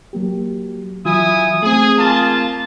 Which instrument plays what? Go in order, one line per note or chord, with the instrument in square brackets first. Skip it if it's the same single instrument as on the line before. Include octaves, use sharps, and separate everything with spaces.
[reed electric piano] F#3 A#3 G4
[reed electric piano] E3 F#3 F4 [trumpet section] E4 G#5 D#6
[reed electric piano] A3 C4 [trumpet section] G#4
[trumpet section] A#3 F4 A5